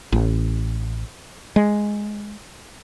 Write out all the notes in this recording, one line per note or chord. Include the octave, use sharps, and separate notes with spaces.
A1
G#3